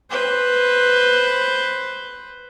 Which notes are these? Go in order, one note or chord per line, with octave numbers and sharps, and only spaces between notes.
B4 C5